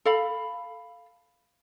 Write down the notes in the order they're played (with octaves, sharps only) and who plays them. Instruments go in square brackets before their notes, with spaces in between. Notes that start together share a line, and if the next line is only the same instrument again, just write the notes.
[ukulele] A4 F5 B5